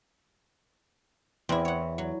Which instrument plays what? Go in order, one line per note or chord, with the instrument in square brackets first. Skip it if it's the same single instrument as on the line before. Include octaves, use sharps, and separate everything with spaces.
[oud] E2 [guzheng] C4 E4
[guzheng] C#5 F#5
F#3